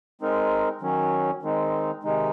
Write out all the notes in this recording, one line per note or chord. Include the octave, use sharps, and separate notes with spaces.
G#3 C4 D#4 A#4
D#3 F#3 C#4
D#3 G#3 C4 D#4
C3 D#3 G#3 D#4